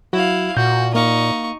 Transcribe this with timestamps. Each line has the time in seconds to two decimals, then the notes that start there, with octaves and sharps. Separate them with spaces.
0.13 F#3 E4 F#4 F5
0.57 A#2 F#4 G6
0.95 A#3 D#4 F5 C#6